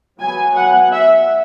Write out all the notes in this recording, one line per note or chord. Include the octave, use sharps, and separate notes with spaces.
F#3 B3 G#5
F#5
E5